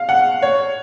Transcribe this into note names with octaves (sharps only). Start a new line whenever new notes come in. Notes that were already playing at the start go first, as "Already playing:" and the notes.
Already playing: F5
F#5
C#5